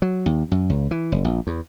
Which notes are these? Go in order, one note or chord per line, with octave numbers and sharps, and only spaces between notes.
F#3
D#2
F#2
C#2
E3
F#1
A#1
E2